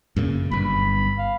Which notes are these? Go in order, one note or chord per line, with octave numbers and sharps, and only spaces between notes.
F#2 A#2 C#3
G1 G2 B5
F5